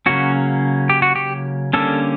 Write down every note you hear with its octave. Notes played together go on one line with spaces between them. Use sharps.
C#3 F#3 A#3 C#4 F#4
G4
F#4
G4
D3 G3 A#3 C#4 A4